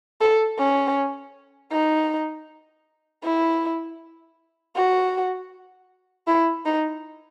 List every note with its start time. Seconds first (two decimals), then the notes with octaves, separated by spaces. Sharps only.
0.21 A4
0.58 C#4
1.72 D#4
3.24 E4
4.76 F#4
6.27 E4
6.65 D#4